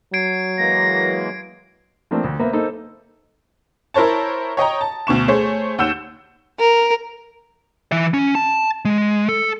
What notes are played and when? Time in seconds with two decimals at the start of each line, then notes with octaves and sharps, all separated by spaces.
0.14 F#3 G#6 C7 D7
0.58 E3 G#3 A#3 A#6
2.11 F3 A3 A#3 C4 D4
2.24 D2
2.39 A#3 B3 B4 C5 E5
2.53 A#3 D#4 A4 C5
3.94 E4 A#4 C5 C#5 A5
4.57 C#5 D#5 G5 A#5
4.81 A5
5.07 D2 B2 C#6 E7
5.28 A3 G#4 C5 C#5
5.78 D#2 F#5 E6 G6 E7
6.58 A#4
7.92 E3 E5
8.14 C#4
8.35 A5
8.85 G#3
9.28 A4